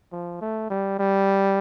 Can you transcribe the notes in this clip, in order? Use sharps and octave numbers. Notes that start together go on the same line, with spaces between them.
F3
A3
G3
G3